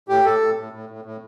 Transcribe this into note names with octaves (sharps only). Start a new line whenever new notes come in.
A2 G4
A2 A4
A2
A2
A2
A2
A2